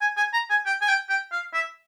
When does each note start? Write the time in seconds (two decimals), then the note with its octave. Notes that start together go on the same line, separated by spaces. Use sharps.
0.01 G#5
0.17 G#5
0.33 A#5
0.50 G#5
0.66 G5
0.81 G#5
0.88 G5
1.09 G5
1.32 F5
1.54 E5